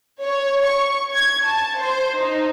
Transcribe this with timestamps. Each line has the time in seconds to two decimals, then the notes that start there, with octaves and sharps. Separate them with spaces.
0.24 C#5
0.66 C#6
1.14 G#6
1.44 A5
1.79 C5
2.20 D#4